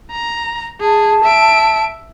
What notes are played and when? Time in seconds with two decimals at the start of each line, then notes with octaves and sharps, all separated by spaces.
0.11 A#5
0.81 G#4 A5
1.24 E5 D7